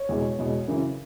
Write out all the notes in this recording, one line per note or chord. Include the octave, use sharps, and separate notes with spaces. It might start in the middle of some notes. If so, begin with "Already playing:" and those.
Already playing: C#5
E2 B2 G#3
E2 B2 G#3
F#2 C#3 E3